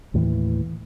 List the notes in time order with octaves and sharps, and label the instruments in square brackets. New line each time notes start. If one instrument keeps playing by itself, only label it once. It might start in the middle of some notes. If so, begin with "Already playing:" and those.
[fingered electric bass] D#2 A2 E3